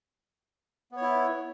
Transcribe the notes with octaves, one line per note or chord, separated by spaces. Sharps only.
B3 E4 C#5